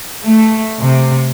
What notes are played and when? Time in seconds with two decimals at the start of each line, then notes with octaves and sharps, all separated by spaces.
0.23 A3
0.80 C3